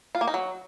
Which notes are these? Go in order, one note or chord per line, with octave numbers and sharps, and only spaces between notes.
F4
A#3
D#4
F#3